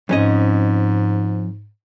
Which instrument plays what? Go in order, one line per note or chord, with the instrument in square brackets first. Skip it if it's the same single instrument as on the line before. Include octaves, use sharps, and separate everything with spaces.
[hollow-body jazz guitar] F2 C#4 D#5 [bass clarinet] G#2